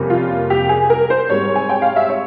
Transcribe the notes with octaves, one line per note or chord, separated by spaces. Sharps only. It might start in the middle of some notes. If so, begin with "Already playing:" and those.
Already playing: F2 C3 G3 A#3 C#4
F4
G4
G#4
A#4
C5
G#2 G3 C4 C#5
G#5
G5
F5
E5
C#5